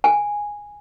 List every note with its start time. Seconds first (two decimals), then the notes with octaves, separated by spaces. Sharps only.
0.04 G#5